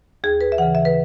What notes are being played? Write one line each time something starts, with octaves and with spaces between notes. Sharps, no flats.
D#2 G#4
B4
E5
C#3 E3 F#5
E5
B4